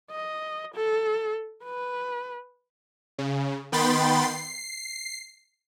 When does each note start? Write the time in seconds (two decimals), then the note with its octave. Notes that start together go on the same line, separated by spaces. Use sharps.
0.11 D#5
0.75 A4
1.64 B4
3.18 C#3
3.72 D#3 B3 G5 B5 C6 A6
4.24 C7